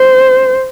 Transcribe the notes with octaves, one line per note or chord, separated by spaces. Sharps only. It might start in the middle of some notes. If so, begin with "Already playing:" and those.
Already playing: C5